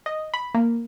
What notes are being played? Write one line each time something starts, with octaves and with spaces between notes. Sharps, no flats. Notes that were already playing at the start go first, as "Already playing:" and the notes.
D#5
B5
A#3